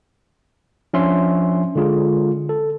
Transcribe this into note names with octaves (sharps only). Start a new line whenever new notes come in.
F3 C#4 D4 E5 C6
D3 G#3 F4 G#4
A4